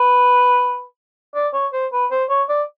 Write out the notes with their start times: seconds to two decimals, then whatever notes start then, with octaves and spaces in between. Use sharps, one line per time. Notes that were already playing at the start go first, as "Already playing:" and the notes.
Already playing: B4
1.35 D5
1.54 C#5
1.73 C5
1.93 B4
2.11 C5
2.30 C#5
2.49 D5